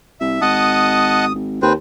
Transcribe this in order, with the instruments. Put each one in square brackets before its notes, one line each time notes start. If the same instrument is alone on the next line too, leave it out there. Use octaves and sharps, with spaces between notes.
[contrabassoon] C2 [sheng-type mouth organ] E5
[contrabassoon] G#1 [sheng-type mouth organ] D#5 F#5 A5 [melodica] D#6
[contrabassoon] G#1
[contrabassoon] D#2 [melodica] C4 B4 C5